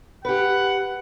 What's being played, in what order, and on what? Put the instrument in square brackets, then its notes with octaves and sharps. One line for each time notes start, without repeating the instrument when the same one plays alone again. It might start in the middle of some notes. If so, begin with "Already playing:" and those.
[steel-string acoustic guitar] G4 B4 [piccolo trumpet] F#5